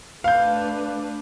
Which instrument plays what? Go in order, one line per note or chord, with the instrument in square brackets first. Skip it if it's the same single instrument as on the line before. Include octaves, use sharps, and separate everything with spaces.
[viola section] A3 D4 B4 [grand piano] F5 G6